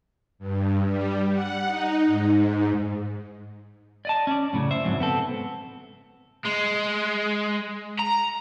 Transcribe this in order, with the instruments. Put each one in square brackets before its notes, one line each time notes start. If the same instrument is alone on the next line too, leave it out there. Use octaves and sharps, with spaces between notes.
[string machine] G2
G3
F#5
D#4
G#2
[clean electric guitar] D5 D#5 A5
C#4 D5
F#2 A2 C#3
C5 E5
F2 G#2 C3 D#3 F#3
B3 C4 A4
[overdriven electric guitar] G#3
A#5